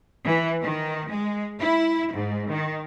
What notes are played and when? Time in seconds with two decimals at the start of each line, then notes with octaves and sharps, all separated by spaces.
0.24 E3
0.61 D#3
1.10 G#3
1.60 E4
2.13 G#2
2.50 D#3